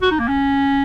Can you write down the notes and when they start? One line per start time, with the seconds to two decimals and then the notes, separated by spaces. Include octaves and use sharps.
0.02 F#4
0.11 D#4
0.19 A#3
0.28 C#4